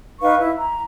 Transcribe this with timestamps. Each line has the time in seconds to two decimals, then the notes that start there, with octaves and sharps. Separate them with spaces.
0.21 D#4 B4 F5 C#6
0.38 E4
0.59 A#5